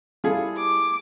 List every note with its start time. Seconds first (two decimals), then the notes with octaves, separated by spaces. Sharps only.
0.24 G3 E4 F4 G#4 A4
0.58 D6